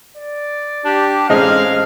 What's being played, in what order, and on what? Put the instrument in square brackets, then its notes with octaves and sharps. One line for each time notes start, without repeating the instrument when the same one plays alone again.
[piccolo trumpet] D5
[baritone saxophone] D4 [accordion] G4
[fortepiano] A1 C4 D#5 [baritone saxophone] G#3 [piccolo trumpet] F5 [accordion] F6